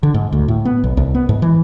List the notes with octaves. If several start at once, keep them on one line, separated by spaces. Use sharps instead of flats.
D3
G#2
D2
A2
B3
B1
C2
B3
G#2
E3